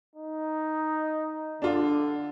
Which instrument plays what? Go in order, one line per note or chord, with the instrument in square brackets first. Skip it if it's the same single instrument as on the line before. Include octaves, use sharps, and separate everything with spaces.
[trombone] D#4
[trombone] D3 [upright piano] D4 F4